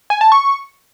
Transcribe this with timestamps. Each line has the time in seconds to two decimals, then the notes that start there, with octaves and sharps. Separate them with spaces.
0.10 G#5
0.21 A5
0.32 C#6